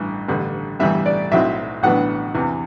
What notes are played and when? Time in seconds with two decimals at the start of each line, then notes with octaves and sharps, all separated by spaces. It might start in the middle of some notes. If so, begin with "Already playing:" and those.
Already playing: A1 G2 E3
0.28 A1 G2 D3 G3
0.79 A1 G2 E3 G3 B3 E5
1.06 D5
1.32 B1 A2 F#3 C4 E4 E5
1.83 A1 A2 F#3 B3 D4 F#5
2.34 E2 C3 E3